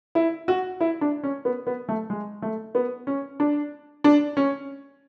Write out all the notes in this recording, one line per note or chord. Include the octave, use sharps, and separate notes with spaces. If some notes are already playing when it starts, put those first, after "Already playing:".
E4
F#4
E4
D4
C#4
B3
B3
A3
G#3
A3
B3
C#4
D4
D4
C#4